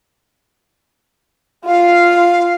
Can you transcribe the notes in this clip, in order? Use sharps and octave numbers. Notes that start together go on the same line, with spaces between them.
F4 F5